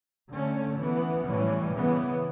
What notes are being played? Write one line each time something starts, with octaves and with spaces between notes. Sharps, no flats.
D3 A3 C#4
E3 B3
A2 E3 G3 C#4
C#3 E3 B3